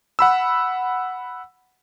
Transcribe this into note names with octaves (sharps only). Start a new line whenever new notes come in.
F#5 B5 E6